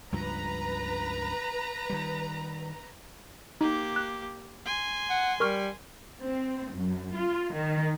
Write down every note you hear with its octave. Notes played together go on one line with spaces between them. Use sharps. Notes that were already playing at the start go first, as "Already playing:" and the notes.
C#2 G2 F3 B4 A#5
D#3 G3
A#3 D#4 G4
F#6
G#5 C6
F#5
G3 A#4 C#6 F6
C4
F#2
F4
D#3